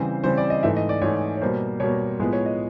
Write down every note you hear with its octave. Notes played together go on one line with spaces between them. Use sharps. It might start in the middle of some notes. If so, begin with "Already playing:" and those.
Already playing: C#3 E3 G3 C4 C5
C#3 E3 G3 C4 C5
D5
D#5
G#2 E3 A3 E5
D#5
D5
G#2 E3 A3 C#5
C#5
B2 G3 A#3 C5
B2 G3 A#3 C#5
A2 F3 G#3 B3
C#5
D#5